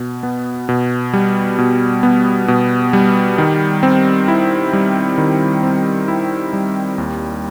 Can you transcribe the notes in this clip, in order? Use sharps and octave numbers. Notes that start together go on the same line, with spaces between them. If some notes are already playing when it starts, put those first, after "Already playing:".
Already playing: B2
B3
B2
G3
B2
B3
B2
G3
D#3
C4
E4
G3
D#3
C4
E4
G3
D#2